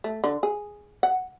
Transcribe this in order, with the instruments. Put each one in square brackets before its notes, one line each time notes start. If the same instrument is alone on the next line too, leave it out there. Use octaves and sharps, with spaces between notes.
[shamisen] A3
D3
G#4
F#5